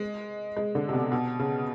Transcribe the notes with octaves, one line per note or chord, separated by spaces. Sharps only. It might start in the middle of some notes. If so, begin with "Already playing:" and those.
Already playing: G#3
G#3
D3
C3
B2
B2
C#3